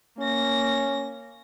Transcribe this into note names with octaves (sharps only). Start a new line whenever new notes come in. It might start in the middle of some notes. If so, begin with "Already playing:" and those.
A#3 C#4 A#6